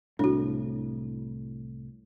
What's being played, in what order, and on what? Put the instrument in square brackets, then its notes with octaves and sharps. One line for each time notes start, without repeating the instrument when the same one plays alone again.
[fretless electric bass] C2 A2 [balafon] D4 F#4